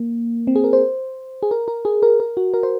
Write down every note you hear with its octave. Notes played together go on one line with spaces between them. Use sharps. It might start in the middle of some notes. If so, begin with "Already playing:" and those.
Already playing: A#3
C4
G#4
A#4
C5
G#4
A#4
A#4
G#4
A#4
A#4
F#4
A#4
C5